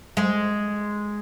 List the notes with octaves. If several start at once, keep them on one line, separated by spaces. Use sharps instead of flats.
G#3